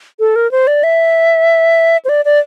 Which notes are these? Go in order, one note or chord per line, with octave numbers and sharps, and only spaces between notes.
A4
A#4
C5
D5
E5
C5
D5
D5